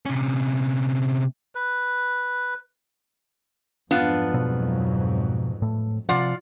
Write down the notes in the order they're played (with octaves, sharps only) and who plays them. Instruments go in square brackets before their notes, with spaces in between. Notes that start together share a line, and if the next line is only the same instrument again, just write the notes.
[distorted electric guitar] C3 C#4
[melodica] B4
[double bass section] F2 G#2 F#3 [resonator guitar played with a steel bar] B3 D4 F4
[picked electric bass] B2 F3 C4
A2 A3
[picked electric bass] C3 F3 [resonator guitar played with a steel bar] F4 D5 F#5